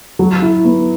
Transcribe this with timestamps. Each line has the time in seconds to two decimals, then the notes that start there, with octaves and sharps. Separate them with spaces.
0.19 F#3
0.42 E4
0.65 B3